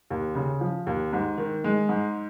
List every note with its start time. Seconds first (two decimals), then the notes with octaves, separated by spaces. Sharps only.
0.10 D#2
0.35 C#3
0.61 F3
0.87 D#2
1.13 G#2
1.38 D#3
1.64 G#3
1.89 G#2